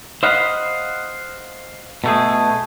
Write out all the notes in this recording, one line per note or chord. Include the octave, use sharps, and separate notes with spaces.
C5 D#5 F5 F#5 B5
B2 A3 G#4